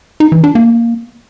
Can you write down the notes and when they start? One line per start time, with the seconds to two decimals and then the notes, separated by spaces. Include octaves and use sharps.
0.20 D#4
0.32 E3
0.44 D4
0.55 A#3